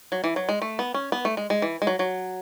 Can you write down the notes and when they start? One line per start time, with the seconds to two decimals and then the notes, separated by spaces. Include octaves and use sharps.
0.12 F#3
0.24 E3
0.36 F#3
0.49 G#3
0.62 A3
0.79 B3
0.94 C#4
1.12 B3
1.25 A3
1.37 G#3
1.50 G#3
1.62 E3
1.82 G#3
1.87 F#3
1.99 F#3